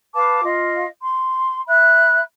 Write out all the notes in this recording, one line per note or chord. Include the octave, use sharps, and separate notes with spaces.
B4 F5 A5 D6
F4 D#5 F5
C6
E5 B5 F#6